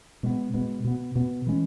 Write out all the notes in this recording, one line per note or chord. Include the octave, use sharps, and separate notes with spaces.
B2 G#3 B3
B2 G#3 B3
B2 B3
B2 B3
E3 G#3 C#4